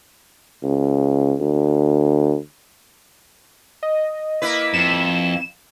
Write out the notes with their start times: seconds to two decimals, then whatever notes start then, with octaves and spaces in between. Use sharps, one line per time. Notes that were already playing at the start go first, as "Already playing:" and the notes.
0.63 C#2
1.40 D2
3.83 D#5
4.42 A#3 E4 B4
4.74 F2 E7